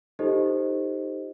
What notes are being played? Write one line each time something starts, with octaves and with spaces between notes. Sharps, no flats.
D#4 F4 G4 A4 C5 D#5